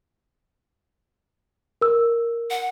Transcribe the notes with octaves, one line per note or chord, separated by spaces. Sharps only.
A#4 E6
F#5